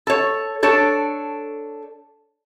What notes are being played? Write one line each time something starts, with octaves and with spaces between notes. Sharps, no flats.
A4 C#5
D4 A4 C#5